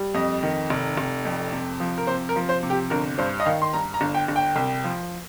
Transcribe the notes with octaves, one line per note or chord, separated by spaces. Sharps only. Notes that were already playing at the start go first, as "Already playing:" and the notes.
Already playing: G3
F2 D#5
D#3
F1
F1
F2
C3
F3
A#4
C3 C5
A#4
F3
C5
C3
G4
G1 A#4
G2 C5
D#5
D#3 F5
C6
G2 A#5
A#5
G1
G5
G1
G5
C2
F3